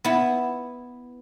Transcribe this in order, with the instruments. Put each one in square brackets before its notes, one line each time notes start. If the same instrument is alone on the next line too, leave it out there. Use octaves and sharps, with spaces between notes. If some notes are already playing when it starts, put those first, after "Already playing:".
[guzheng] B3 E4